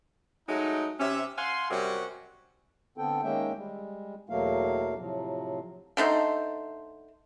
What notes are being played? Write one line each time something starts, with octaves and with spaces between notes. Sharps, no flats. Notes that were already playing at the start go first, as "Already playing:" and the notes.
F#3 G#3 A3 D#4
C3 C#4 E5
F5 F#5 G#5 C6
F#2 C3 F#3 G3 C#4 F#4
D3 B3 C4 A4 G5
D#3 G#3 A#3 C#4 E5 G5
G3 G#3
E2 B2 F#3 A3 A#3 F5
A2 C3 F3 F#3
D3 A3 D#4 C5